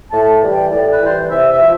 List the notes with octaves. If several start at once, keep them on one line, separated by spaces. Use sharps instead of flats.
A2 A5
E3 G3
G5
A2 D5
B4
E3 G3 C5
D5
C3 E5
E5
F3